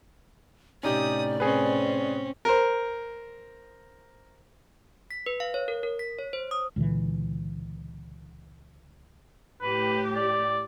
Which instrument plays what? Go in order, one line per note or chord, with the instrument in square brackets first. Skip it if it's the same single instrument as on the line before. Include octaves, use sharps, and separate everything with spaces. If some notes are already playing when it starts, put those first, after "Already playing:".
[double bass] A2 C3 [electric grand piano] C#4 D#4 G4 [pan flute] D5 [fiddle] D#6
[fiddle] C4 C#4 [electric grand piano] G#4 B4
[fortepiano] A#4 C5
[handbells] B6
B4
F5
C#5
A#4
A#4
B6
C#5
C5
D#6
[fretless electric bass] C#2 A#2 D3 E3
[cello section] A2 G4 [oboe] B4
[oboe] D5